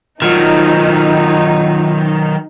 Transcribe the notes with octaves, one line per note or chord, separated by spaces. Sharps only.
D#3 F#3 D#4 F4